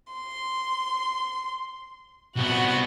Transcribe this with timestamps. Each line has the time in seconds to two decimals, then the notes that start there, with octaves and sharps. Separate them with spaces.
0.14 C6
2.37 C2 B3 F#4 F#5